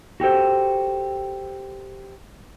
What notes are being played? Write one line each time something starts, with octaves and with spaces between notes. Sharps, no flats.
F#4 G4 A4 C5